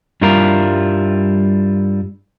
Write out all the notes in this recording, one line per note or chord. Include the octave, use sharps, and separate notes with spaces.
G2 G3 E4 F4 A#4